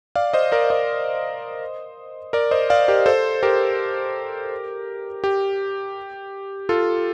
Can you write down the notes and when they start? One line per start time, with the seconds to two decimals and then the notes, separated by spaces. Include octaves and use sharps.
0.15 D5 F5
0.33 C5 D#5
0.52 A#4 D5
0.70 C5 D#5
2.33 A#4 D5
2.51 C5 D#5
2.70 D5 F5
2.88 G4 A#4
3.06 A4 C5
3.43 G4 A#4
5.24 G4
6.69 F4 A4